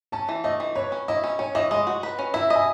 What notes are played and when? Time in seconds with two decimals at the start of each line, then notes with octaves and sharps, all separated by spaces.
0.12 C#4 A5
0.29 E3
0.44 A3 D#5
0.60 E3
0.75 B4 C#5
0.92 C#4
1.08 E4 D#5
1.24 C#4
1.39 C#4 C#5
1.55 E3 D#5
1.71 G#3 D#5
1.87 F#4
2.03 B4
2.19 C#4
2.34 E4 E5
2.50 D#5
2.56 G#5